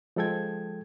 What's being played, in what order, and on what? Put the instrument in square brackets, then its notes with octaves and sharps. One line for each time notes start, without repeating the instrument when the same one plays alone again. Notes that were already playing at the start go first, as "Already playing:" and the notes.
[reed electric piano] F3 G#3 A4 G5 G#6